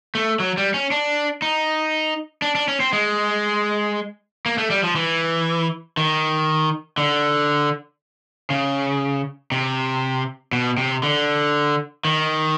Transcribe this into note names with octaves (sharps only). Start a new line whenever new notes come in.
A3
F#3
G3
C#4
D4
D#4
D4
D4
C#4
C4
G#3
A#3
A3
G3
F3
E3
D#3
D3
C#3
C3
B2
C3
D3
D#3